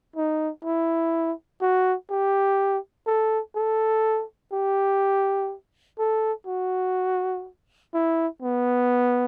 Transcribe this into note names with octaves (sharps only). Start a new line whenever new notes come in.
D#4
E4
F#4
G4
A4
A4
G4
A4
F#4
E4
B3